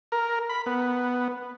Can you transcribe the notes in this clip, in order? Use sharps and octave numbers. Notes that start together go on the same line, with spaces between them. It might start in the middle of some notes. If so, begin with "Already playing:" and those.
A#4
B5
B3